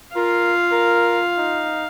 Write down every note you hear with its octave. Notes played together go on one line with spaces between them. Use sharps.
F4 A#4 F5
A#4
D#4